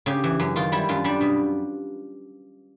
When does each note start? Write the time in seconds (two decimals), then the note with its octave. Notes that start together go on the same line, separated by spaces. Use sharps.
0.06 C#3 G4
0.24 E3
0.40 F#2
0.56 D#3 F4
0.72 G3 E4
0.89 F#2 F4
1.04 G3 D4
1.21 B2